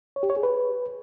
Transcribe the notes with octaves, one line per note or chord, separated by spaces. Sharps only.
C#5
G4
C#5
G#4
B4